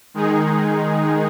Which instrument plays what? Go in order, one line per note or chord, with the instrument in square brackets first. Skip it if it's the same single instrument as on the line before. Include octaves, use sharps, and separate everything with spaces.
[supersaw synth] D#3 G#3 D#4 G#4